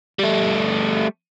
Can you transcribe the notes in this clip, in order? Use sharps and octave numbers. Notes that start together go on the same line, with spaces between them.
G3 A3